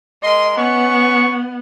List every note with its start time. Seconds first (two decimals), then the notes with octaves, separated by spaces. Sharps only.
0.23 G#3 A#4 D#5 C6
0.57 B3 C#4 C#6